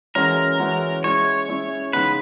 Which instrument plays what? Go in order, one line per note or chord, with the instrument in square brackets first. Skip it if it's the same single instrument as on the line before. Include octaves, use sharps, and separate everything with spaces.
[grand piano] E3 G#3 C#4 F#4 [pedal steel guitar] A#4
[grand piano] E3 G#3 C#4 F#4
[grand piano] G#3 C#4 E4 [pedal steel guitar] C#5
[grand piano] G#3 C#4 E4
[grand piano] C#3 G#3 B3 D#4 [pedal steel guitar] B4